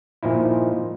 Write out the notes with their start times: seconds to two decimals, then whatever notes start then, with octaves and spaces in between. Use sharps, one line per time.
0.23 A#2 F3 D#4 E4